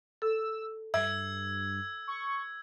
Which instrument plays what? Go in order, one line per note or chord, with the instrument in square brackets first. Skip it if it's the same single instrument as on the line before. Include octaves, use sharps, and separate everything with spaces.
[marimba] A4 [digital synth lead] E6
[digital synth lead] G2 [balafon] E5 [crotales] E6 G#6
[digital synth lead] C#6